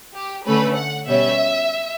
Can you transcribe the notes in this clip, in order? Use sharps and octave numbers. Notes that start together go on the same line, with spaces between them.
G4
D3 A3 C#4 B4
F#5
B2 G3 C#4 E5